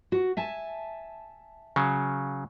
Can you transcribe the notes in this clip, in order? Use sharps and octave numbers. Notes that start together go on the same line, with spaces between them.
F#4
E5 G#5 A5
C#3 F#3